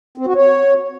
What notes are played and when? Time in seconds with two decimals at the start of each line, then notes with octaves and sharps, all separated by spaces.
0.18 C4
0.27 F#4
0.36 C#5